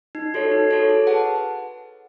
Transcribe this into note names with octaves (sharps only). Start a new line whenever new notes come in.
D#4
F#4 A4 C#5
D#4
F#4 A4 C#5
G#4
B4 F#5 A5